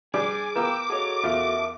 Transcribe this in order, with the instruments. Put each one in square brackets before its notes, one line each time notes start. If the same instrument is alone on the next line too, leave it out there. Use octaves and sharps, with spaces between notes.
[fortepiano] G3 D4 D5 [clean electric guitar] G#4 [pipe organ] G#5 [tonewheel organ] D6
[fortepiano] B3 F4 A#4 [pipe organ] G5 E6
[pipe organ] F#4 A4 D#5 [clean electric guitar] G#4 C#5
[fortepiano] E2 F4 [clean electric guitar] A#4 E5